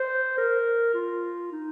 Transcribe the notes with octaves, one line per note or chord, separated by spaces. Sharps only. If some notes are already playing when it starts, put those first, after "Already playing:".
Already playing: C5
A#4
F4
D#4